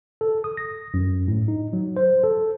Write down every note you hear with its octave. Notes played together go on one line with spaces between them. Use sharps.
A4
D#6
A#6
F#2
A2
D#4
F#3
C5
A4